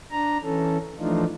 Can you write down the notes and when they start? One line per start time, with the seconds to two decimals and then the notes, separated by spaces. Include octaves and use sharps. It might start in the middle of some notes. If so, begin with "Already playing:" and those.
0.11 D4 A#5
0.43 E3 C#4 A4
0.99 E3 F3 A3 D4 D#4 F4